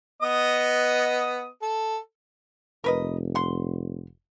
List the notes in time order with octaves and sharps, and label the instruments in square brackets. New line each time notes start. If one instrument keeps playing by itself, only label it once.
[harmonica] B3 D#5 D#6
A4
[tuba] F1 [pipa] A#4 B4 D#5
[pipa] F#5 C6